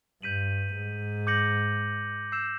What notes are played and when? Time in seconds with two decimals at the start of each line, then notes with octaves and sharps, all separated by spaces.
0.22 G2 G6 B6 D#7 F#7
0.75 G#2
1.27 D6 G6 A#6 C#7 F#7
2.32 E6 G6 C7 E7